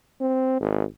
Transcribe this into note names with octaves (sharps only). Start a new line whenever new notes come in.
C4
G#1